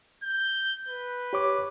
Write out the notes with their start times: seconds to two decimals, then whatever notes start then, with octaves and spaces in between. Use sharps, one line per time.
0.23 G6
0.88 B4
1.33 G4 C#5 D6